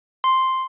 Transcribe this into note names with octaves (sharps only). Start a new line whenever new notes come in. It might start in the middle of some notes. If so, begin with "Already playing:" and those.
C6